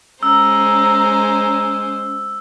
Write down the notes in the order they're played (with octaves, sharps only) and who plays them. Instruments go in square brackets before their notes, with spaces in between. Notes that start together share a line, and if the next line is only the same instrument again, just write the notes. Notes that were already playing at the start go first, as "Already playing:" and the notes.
[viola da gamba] G#3 C5 [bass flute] C#4 [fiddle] A#5 [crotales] E6